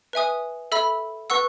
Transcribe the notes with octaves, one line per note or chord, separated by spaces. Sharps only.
B4 E5 G#5 D#6
A4 E5 B5 E6
B4 F#5 C#6 E6